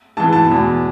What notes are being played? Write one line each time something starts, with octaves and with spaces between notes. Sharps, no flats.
G#2 E3 A5
A5
E2 B2